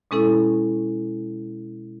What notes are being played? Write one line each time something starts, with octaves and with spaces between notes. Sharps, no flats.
B2 G#3 C#4 E4 A4